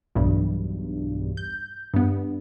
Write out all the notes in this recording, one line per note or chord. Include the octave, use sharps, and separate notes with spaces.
B1 E2 G2
G6
G2 B3